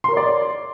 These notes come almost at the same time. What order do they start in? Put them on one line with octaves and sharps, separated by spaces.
C6 A#4 C#5 D5